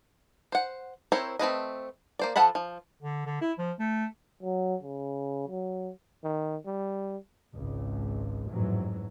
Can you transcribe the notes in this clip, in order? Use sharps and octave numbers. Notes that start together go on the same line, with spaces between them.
C5 F#5
C4 E4 A#4 C5 C#5
A3 C4 B4 D#5
A#3 C5 D5
F3 A4 F#5 A5 B5
F3
D3
D3
E4
F3
A3
F#3
C#3
F#3
D#3
G3
G#1 C#2
A1 F2 G#2 E3 F#3